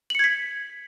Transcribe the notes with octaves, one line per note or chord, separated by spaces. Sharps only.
G#6 B6 C#7 F#7